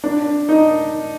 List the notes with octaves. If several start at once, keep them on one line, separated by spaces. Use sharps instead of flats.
D4
D#4